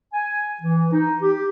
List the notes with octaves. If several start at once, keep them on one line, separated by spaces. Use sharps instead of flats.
G#5
E3
D#4
G4